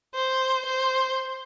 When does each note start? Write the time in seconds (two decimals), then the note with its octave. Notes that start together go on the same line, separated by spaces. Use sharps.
0.15 C5
0.66 C5